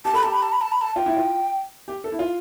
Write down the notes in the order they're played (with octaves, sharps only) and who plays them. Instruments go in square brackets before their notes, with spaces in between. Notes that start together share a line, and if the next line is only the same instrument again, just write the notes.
[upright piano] G4 [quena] A5
[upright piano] A4 [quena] B5
[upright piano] G4 [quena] A5
[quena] B5
A5
B5
A5
B5
A5
[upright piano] F4 [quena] G5
[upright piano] E4
F4
G4
A4
E4
F4